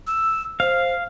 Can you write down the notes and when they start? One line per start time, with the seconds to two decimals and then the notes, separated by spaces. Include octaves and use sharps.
0.07 E6
0.60 C5 F5